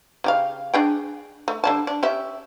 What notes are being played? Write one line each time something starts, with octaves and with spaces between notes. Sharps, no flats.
C#3 G4 F5
D4 G#4 G5
A3
D3 G3 A5
D4
C#4 G4 E5